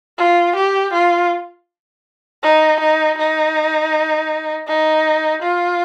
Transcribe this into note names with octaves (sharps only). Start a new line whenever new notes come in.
F4
G4
F4
D#4
D#4
D#4
D#4
F4